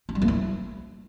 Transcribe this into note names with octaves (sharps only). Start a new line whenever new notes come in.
E4
G3
A#3
E4